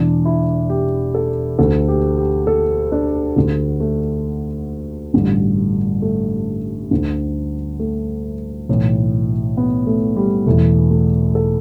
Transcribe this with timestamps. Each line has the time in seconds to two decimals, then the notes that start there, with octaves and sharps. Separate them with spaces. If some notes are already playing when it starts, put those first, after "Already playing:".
Already playing: E1 E2 E3 D4
0.25 E4
0.70 G4
1.14 A4
1.59 D2 D3 A4
1.88 G4
2.18 G4
2.47 A4
2.92 D4
3.36 D2 D3
3.80 A3
5.14 A1 G2 D3
6.02 A3
6.91 D2 D3
7.80 A3
8.69 B1 A2 E3
9.57 B3
9.87 A3
10.16 G3
10.46 E1 E2 E3 A3
10.90 A3
11.35 A4